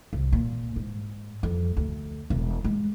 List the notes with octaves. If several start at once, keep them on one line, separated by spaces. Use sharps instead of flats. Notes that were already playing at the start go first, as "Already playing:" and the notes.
C2
A#2
G#2
F2
D2
E1
G#3